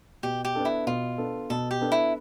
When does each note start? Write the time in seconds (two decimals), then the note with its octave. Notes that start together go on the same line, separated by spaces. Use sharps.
0.23 B2 G4
0.45 G4
0.55 B3 D4 A4
0.65 E4
0.87 B2 F4
1.18 B3 D4 A4
1.50 B2 A4
1.71 G4
1.81 B3 D4 A4
1.92 E4